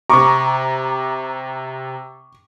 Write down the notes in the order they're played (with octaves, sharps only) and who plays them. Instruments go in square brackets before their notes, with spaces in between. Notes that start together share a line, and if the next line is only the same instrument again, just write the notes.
[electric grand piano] C3 A#5 [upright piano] C#6 D6